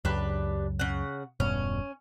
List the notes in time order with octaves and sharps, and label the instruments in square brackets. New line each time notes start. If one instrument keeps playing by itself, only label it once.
[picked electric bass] C#2 F#2 [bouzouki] D4 G4 B4
[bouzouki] C#3 F#5
[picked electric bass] E1 G2 B2 [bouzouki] C#4